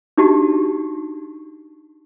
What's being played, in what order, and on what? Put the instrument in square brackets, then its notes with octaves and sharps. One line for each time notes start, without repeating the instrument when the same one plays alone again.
[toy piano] D4 D#4 F#4 G4 A5